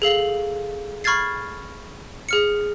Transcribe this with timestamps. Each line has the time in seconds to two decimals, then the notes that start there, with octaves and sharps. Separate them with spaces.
0.02 G#4 A4 F5 F#7
1.04 B5 C#6 F6 G#6 A6 C7
2.29 G#4 F6 C#7